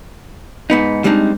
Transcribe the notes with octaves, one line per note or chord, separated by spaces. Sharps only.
G#2 B3 D#4
G3 G#3 C4 D4 D#4